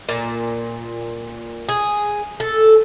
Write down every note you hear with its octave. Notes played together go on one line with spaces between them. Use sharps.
A#2
G#4
A4